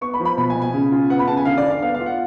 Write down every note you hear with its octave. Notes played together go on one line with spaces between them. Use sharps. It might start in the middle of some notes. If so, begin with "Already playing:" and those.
B3 C#6
B5
F3
B5
B2 B5
G#5
B2
G#5
C#3
F4
B3 F#5
B5
C#3 A5
G#5
D3 F5
D5
D3
F5
B3 F5
F5
F4
F#5